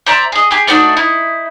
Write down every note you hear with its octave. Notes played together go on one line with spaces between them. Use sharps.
C5 D5 E5 A#5
G#4 D#5
G4 G#4
A3 D4 D#4 F#4
D#4 E4